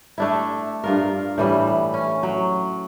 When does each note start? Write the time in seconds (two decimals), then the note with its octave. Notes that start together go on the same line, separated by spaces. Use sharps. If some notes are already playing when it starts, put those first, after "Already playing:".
0.18 A3 D4 E4
0.84 G2 F4 A#4
1.38 A2 E3 G3
1.94 C#4
2.23 F#3